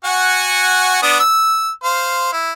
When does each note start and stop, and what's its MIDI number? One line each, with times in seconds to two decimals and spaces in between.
0.05 1.02 66
0.05 1.02 78
0.05 1.02 80
1.02 1.19 59
1.02 1.19 62
1.02 1.19 87
1.19 1.70 88
1.84 2.30 72
1.84 2.30 77
2.32 2.53 64